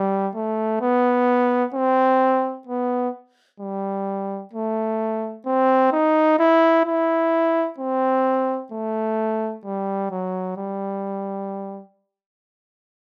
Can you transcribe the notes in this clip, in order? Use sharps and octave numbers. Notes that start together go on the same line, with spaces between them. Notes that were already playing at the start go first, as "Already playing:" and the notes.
Already playing: G3
A3
B3
C4
B3
G3
A3
C4
D#4
E4
E4
C4
A3
G3
F#3
G3